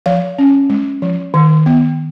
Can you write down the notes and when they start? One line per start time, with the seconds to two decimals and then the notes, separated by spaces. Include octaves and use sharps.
0.06 F3 F5
0.38 C#4
0.70 G#3
1.02 F3
1.34 D#3
1.66 B3